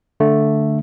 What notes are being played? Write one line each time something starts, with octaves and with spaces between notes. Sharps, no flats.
D3 A3